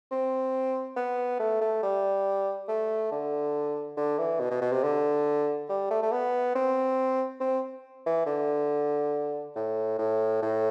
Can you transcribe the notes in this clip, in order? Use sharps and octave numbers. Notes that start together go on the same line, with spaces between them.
C4
B3
A3
A3
G3
A3
D3
D3
E3
B2
B2
B2
C3
D3
G3
A3
A3
B3
C4
C4
E3
D3
A2
A2
A2